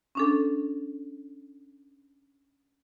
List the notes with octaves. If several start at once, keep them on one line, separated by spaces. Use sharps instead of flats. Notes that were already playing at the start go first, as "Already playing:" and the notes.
C#4 D4 A4